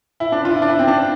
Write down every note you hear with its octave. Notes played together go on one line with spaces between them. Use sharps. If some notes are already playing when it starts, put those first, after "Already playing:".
E4
D4
F4
E4
D4
E4
C4
D4